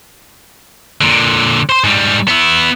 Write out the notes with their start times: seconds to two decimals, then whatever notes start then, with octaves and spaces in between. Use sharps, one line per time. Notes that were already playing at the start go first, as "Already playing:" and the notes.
1.01 A#2 D3
1.69 C5 C6
1.84 G#2 G3
2.28 B3 E4